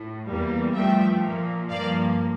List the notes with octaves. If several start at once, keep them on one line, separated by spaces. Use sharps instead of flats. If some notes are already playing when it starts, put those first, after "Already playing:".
Already playing: A2
E2 E3 G3 A#3
G2 F3 A3 E5 G5
A#2 F3 A#3
G2 F3 A#3 D5 F5